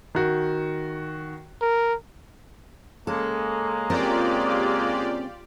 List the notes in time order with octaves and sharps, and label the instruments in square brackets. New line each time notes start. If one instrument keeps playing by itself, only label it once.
[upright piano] D#3 F#4
[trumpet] A#4
[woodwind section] C#3 G#3 A#3 [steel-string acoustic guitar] A4
[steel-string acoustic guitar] C4 C#4 A#4 [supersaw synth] F4 G4 D5